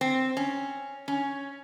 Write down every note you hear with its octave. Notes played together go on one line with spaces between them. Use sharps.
C4
C#4
C#4